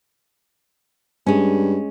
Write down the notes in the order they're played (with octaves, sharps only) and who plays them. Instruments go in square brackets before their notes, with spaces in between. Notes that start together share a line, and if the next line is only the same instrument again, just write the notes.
[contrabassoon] G2 [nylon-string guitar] G#3 C#4